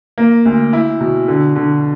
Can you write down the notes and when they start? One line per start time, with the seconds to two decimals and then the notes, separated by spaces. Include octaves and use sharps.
0.18 A#3
0.46 D2
0.73 E4
1.01 B2
1.28 D3
1.56 D3